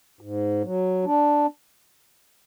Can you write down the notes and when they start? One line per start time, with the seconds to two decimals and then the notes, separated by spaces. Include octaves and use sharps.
0.21 G#2
0.63 F#3
1.05 D4